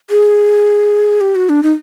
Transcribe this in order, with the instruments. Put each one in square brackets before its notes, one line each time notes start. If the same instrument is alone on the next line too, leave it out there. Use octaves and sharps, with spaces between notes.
[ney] G#4
G4
F#4
D4
D#4